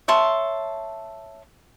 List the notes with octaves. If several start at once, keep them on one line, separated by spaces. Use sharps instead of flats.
C#5 E5 A5 C6